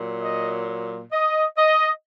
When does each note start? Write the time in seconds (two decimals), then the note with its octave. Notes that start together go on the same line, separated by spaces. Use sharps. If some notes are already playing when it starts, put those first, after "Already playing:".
Already playing: A#2 F#3
0.20 D#5
1.12 D#5
1.57 D#5